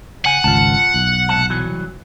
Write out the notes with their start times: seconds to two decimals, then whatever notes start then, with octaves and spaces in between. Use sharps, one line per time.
0.25 C#3 F#5 G#5
0.44 G#1 C#2 F4 A5
0.94 B1
1.29 G#2 C3 A5
1.50 C2 E3 F#3